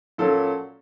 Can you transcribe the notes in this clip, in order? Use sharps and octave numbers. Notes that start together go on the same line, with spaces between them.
A#2 F#3 A#3 C#4 A4